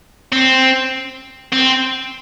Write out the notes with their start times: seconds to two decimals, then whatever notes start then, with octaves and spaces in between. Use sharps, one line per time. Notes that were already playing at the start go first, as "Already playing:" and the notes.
0.33 C4
1.53 C4